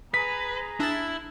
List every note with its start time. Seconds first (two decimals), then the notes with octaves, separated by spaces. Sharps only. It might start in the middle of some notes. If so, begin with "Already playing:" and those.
0.14 G#4 B4 A#5 B6
0.80 D4 E4 A6